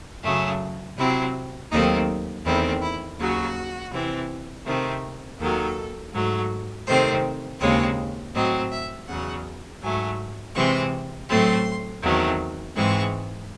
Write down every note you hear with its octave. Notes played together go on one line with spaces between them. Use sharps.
F#2 C#3 F#3 A3 G#4
C3 F#3 C4 E4
D#2 D#3 F#3 A3 C4 D#4
E2 D#3 A3 C4 E4
E4
D#2 C#3 F#3 F#4
C3 E3 C4
C3 D#3 A3 C4
D#2 D#3 F#3 A4
G#2 F#3 A3
C3 D#3 A3 C4 C5
D#2 C#3 G#3 C4 C#5
A2 F#3 C4 D#5
E5
E2 C#3 F#3 F#5
G#2 F#3 A3 G#5
C3 E3 G#3 C4 C#6
A2 F#3 A3 C4 C6
E2 D#3 F#3 A3 C4
G#2 E3 G#3 C4 C#6